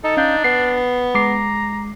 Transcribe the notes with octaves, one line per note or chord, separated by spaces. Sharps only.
D#4 A4
C#4 D4 F5 G6
B3 C7
G#3 A#5 D6 C7